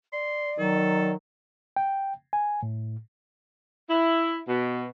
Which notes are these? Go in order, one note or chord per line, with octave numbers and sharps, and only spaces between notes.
D5 C6
D#3 F#3 A4
G5
G#5
A2
E4
B2